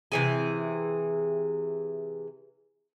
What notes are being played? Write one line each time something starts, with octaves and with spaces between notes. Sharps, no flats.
C3 E3 G#4